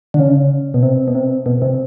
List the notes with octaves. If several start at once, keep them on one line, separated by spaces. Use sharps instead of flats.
D3
C#3
B2
C3
B2
C3
B2
C3